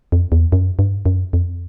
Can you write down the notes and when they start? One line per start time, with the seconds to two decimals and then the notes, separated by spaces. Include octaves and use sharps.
0.12 F2
0.32 E2
0.52 F#2
0.79 G2
1.06 F#2
1.33 F2